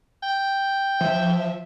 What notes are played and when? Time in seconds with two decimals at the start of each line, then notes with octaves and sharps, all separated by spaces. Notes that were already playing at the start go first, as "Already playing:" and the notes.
0.23 G5
1.01 F3 E5